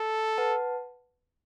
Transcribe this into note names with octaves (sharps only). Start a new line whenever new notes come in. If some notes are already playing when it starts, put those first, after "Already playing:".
Already playing: A4
B4 F#5 A5